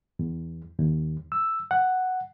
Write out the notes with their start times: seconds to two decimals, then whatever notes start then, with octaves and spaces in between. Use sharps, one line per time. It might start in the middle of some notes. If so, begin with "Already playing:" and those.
0.19 E2
0.79 D#2
1.32 E6
1.71 F#5